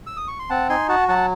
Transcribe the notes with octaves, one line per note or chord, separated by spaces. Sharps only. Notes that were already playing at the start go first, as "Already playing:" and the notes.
E6
D#6
C#6
C6
C4 F#5 A5
D#4 G#5 C6
F#4 F#5 A5
F#3 F#5 A5